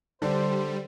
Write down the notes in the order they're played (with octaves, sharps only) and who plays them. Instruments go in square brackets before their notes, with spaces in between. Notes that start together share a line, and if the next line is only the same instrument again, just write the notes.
[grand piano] D3 D4 [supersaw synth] G3 [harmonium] C5